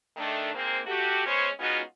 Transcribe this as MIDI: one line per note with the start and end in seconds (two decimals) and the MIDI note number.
0.17 0.50 51
0.17 0.50 57
0.17 0.50 62
0.54 0.80 44
0.54 0.80 58
0.54 0.80 60
0.87 1.22 57
0.87 1.22 66
0.87 1.22 67
1.26 1.48 56
1.26 1.48 59
1.26 1.48 61
1.26 1.48 72
1.26 1.48 73
1.59 1.81 56
1.59 1.81 59
1.59 1.81 61
1.59 1.81 63
1.59 1.81 65
1.59 1.81 66